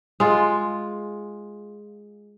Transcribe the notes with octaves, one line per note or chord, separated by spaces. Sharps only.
G#3 F4